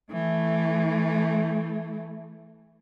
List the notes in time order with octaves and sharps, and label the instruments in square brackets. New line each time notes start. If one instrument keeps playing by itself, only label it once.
[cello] E3 A3